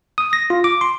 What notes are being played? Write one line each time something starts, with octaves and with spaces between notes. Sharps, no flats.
D#6
A#6
F4
D6
C6